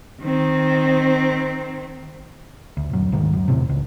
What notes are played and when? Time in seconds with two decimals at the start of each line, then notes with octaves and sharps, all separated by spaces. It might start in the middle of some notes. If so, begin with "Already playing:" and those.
0.22 D#3 C4
2.77 D2
2.90 D#1 F#2
3.12 D2 G#2 D#3
3.33 F#2
3.48 E2 A2 C3
3.69 C#2